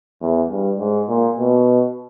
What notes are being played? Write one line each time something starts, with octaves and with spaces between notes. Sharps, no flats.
E2
G2
G#2
A#2
B2